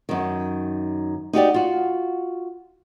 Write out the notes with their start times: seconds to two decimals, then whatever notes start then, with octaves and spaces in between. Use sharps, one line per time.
0.09 F#2 D#3
1.33 D#4 F#4 G4 D5
1.54 F4 F#4